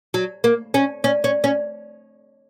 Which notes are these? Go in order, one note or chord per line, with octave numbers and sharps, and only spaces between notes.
F#3
A#3
C#4
C#4
C#4
C#4